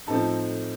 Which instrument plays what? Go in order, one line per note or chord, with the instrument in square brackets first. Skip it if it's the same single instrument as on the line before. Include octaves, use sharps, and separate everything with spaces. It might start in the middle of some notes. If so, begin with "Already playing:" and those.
[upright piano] A2 F3 C4 D#4 A4 A5